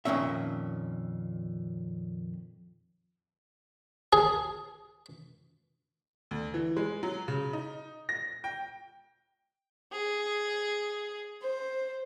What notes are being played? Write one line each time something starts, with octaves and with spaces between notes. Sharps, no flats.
F2 A#2 D#3 C#4 E5
G#4
D2
E3
G#3
F#3
C#3
D#4
A#6
G5
G#4
C5